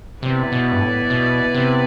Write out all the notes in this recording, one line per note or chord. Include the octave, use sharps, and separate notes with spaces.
C3 B3 E4 B4 D5
B2
G2
A2
B2
C3